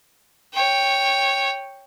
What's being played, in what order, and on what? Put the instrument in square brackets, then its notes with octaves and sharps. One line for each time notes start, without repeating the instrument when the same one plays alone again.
[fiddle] C#5 G5